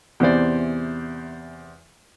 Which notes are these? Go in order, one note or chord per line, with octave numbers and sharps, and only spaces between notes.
E2 C3 E3 C5 D5